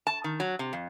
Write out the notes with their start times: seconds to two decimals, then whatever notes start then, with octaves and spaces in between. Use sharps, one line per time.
0.07 A5
0.24 D#3
0.40 F#3
0.59 C3
0.73 F2